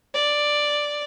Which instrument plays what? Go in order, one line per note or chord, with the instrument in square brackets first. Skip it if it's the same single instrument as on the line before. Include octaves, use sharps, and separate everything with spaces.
[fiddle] D5